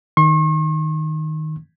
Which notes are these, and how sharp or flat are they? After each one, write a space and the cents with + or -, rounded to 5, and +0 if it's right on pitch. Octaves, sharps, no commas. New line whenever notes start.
D#3 +0 C#6 -45